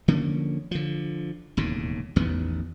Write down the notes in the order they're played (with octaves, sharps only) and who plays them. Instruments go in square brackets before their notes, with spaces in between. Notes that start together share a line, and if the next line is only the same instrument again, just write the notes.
[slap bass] D3 F3 A#3 C#4
D3 F3
E1 D#2 A2 C#3
A1 E2 D#3 B3